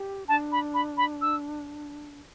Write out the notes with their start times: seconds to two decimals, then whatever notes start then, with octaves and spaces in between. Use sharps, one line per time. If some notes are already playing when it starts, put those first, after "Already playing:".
Already playing: G4
0.28 D4 A5
0.52 B5
0.74 B5
0.97 B5
1.22 E6